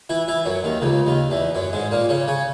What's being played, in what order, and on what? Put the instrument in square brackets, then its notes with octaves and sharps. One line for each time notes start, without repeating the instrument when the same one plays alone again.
[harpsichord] E3 E4
E3 E4
F#2 F#3
D#2 D#3
C#2 C#3
D#2 D#3
E2 E3
F#2 F#3
G#2 G#3
A#2 A#3
C#3 C#4
C#3 C#4